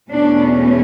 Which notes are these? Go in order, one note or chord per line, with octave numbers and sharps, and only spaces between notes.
E2 B2 A3 C#4 D4